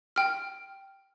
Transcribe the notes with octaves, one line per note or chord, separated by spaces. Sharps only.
G5 F6